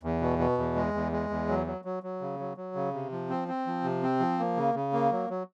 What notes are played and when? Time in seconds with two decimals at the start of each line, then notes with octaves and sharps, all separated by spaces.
0.03 E2
0.21 B2
0.39 B2
0.58 E2
0.76 G#3
0.94 E2
1.12 G#3
1.30 E2
1.49 F#3
1.67 F#3
1.85 F#3
2.03 F#3
2.21 C#3
2.39 F#3
2.57 F#3
2.75 C#3
2.93 C3
3.12 F3
3.30 C4
3.48 C4
3.67 F3
3.84 C3
4.03 C4
4.20 F3
4.39 A#3
4.57 C#3
4.75 C#3
4.93 A#3
5.12 F#3
5.30 F#3